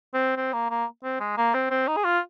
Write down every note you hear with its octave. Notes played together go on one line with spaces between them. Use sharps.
C4
C4
A#3
A#3
C4
G#3
A#3
C4
C4
D#4
G#4
F4